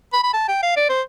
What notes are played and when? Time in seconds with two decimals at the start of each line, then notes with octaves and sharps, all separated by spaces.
0.13 B5
0.24 B5
0.34 A5
0.48 G5
0.63 F5
0.77 D5
0.89 C5